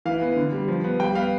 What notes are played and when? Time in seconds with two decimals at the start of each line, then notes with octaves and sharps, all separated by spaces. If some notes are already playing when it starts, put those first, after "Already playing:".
0.05 E3 F5
0.21 B3
0.36 D3
0.52 G3
0.68 F3
0.84 B3
1.00 G3 G5
1.15 B3 F5